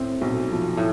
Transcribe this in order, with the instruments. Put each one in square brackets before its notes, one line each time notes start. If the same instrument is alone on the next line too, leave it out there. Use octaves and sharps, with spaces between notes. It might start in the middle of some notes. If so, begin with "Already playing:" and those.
Already playing: [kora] A2 [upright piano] C4
[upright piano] B1
F3
[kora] A2